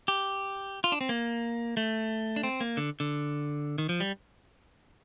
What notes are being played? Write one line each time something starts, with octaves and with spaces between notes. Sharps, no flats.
G4
F4
D4
C4
A#3
A3
D4
C4
A#3
D3
D3
D#3
F3
G3